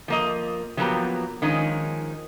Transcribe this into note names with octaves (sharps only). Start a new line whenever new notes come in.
F3 A#3 D#5
F3 F#3 A#3 B3 G4 A#5
D#3 F3 G#3 C#4 D#4